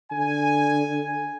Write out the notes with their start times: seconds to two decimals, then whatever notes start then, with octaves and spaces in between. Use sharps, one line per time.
0.11 D3 G#5